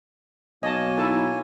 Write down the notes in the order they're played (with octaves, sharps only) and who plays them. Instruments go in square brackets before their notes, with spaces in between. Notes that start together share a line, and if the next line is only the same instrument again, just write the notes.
[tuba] B1 [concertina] A#3 C#5 G#5 [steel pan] D#5 A5
[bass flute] D#4 [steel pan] E4 A4 A5